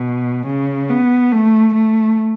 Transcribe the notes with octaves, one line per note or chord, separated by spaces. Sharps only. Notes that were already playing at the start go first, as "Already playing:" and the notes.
Already playing: B2
C#3
B3
A3
A3